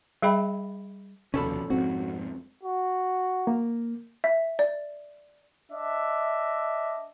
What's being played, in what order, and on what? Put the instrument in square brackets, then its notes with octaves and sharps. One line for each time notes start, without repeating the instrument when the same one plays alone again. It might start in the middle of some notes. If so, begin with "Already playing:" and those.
[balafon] G3 G#4 D#5 E5 G5 B5
[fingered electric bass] F1 D#2 [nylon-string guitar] B2 F3 D4 [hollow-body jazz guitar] C#4 A4 B5
[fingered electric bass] F2 G#2 [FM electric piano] C4 [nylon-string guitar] F#4
[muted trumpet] F#4
[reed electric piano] A#3
[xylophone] E5
D5
[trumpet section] D4 D#5 E5